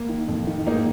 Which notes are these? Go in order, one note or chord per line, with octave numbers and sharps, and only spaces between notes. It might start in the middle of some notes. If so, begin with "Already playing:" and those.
Already playing: A#3
D#3
F2
D#3
G#2 A#3 D#4